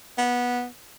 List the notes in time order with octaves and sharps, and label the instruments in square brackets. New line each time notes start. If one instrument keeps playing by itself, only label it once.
[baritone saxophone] B3